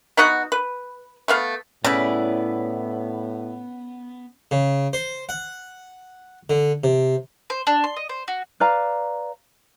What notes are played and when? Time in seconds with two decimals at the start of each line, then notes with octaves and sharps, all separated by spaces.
0.17 B3 D#4 F#4 F#5
0.52 B4
1.28 A3 B3 F5
1.84 A2 C#3 B3 E4 B4 D5
4.51 C#3
4.93 C5
5.29 F#5
6.50 D3
6.84 C3
7.50 C5
7.67 D4
7.84 C6
7.97 D#5
8.09 C5
8.28 F#4
8.60 B4 D5 F5 A#5